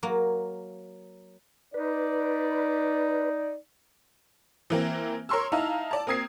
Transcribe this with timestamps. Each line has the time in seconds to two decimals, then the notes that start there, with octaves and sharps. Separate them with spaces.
0.03 F#3 A#3
1.74 D#4 B4 D5
4.70 E3 A#3 C4
5.29 A#4 C#5 C6 C#6 E6
5.52 D#4 E4 F5 A5 A#5
5.91 D5 A5
6.07 A#3 C4 D#6 G#6 C7